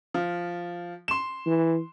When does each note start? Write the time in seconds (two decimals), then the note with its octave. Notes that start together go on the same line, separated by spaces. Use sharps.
0.14 F3
1.08 C6 E7
1.46 E3